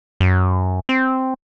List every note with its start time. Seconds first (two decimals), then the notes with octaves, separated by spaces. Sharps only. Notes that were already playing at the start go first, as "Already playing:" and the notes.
0.20 F#2
0.89 C4